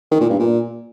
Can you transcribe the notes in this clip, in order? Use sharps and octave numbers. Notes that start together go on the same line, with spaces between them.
D#3
A#2
G2
A#2